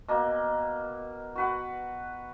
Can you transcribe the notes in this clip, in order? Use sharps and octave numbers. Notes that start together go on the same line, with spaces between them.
B2 A#3
F#4 B4 F#5